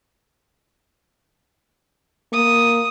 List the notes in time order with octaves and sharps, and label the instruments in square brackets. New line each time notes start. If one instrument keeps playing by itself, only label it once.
[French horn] A#3 [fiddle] D#6